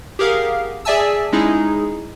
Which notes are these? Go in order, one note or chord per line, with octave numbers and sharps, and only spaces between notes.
G4 G#4 A#4 F5 F#5
G#4 D5 E5 G#5 A5 E6
G#3 C#4 D#4 E4 G#4